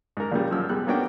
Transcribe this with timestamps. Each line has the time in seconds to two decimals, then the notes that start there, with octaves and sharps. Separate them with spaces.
0.17 G#2 A#4
0.32 A#1 A#2 C#3 G3
0.51 F#2 F3 E6
0.69 B2 G3 G#3 F#6
0.87 A#3 B3 C#4 D4 F#4 G5